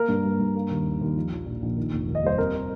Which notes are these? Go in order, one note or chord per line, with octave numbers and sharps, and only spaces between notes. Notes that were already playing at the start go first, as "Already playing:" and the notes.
Already playing: A#3 A#4
G2
G3
G2
A#3
D#2
D#3
D#2
F3
A#1
A#2
A#1
D#3
F1
D#2
D#5
G3 C5
C4 A#4